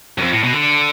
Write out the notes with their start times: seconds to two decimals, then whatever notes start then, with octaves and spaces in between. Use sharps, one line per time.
0.18 F#2
0.22 F2
0.33 A2
0.43 B2
0.53 D3